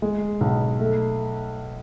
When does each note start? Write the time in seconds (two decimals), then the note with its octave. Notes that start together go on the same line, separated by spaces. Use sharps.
0.02 G#3
0.41 B1
0.79 A3